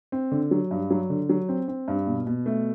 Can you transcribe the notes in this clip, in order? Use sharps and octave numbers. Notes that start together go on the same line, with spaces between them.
C4
D3
F#3
G2
F#3
D3
F#3
C4
C4
G2
B2
B2
A3